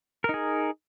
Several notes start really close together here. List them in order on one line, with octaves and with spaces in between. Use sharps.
A#4 D#4 G#4